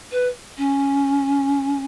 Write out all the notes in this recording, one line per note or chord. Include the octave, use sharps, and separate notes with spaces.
B4
C#4